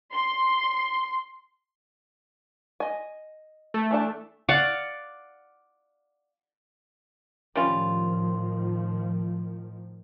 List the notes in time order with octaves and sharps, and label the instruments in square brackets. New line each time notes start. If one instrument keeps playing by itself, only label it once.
[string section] C6
[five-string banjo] D#5 G#5
[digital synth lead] A3
[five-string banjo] E3 D4 A5
[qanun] D5 F5 F#5
[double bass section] A2 D#3 F3 [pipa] G3 C#4 F4